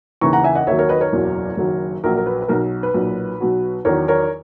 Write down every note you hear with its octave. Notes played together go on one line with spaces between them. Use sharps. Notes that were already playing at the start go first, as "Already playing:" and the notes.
D#2 C#3 E3 A#5 C#6
F#5 A#5
E5 G#5
D#5 F#5
D#2 D#3 F#3 C#5 E5
A#4 C#5
B4 D#5
A#4 C#5
F#1 E2 B2 F#3
F#1 F#2 D#3 F#3
A#1 A#2 F#3 A#4
A#4
B4
B4
B1 B2 F#3 A#4
B4
B1 A#2 F#3
B1 B2 F#3
E2 D#3 F#3 A#4 C#5
A#4 C#5